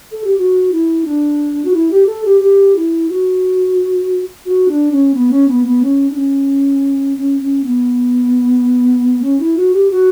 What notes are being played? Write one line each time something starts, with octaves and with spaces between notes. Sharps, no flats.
A4
G4
F#4
E4
D4
F#4
E4
G4
A4
G4
G4
E4
F#4
F#4
D4
C#4
B3
C#4
B3
B3
C#4
D4
C#4
C#4
C#4
B3
C#4
E4
F#4
G4
F#4